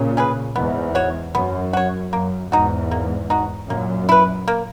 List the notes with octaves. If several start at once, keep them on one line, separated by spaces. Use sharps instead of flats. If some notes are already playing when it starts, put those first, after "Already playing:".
Already playing: A#2 C#3
C#4 G#4 B4
E2 G#2 B3
F#4 C#5
F#2 B3
F#4 C#5
F#2 A#3
E2 G#2 D#4 F#4
A#3
D#4 F#4
F#2 A#2 A#3
E4 B4
A#3